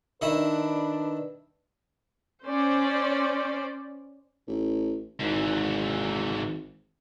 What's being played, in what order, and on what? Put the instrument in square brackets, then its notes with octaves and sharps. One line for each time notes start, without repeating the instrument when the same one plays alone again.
[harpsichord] D#3 E4 D#6 [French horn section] D4 B4
[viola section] C#4 C5 D5
[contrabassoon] A1
[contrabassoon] G#1 [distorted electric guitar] G#2 E3